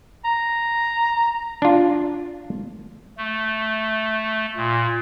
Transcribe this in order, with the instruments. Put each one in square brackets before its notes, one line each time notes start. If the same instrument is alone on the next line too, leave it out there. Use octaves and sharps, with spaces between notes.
[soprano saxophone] A#5
[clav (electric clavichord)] D4 F4
[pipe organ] A3
A#2